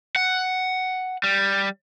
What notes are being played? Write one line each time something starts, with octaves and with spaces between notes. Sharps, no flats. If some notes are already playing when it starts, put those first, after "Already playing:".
F#5
G3